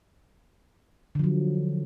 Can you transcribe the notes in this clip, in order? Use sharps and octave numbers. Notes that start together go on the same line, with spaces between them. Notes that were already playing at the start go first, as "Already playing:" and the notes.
D3 F3 F#3